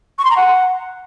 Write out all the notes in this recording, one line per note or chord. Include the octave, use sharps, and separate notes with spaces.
C#6
C6
A#5
F#5